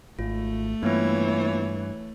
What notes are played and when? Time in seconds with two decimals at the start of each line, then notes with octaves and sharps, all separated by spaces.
0.19 G#1 A3 F4
0.83 G2 E3 A#3 B3 F4 C#5